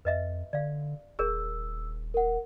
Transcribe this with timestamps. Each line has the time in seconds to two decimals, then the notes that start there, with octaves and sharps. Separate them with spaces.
0.05 F2 B4 D#5 E5
0.53 D3 D5 F5
1.19 D#1 G#4 A#4 C#5 E6
2.14 A#4 F#5